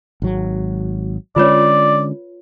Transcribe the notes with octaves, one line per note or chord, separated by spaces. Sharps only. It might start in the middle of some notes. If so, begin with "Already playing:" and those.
G#1 F#3
D3 G#3 C#4 F4 B4 C#5 D5